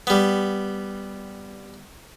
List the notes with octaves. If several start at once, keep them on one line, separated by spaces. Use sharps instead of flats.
G3 B3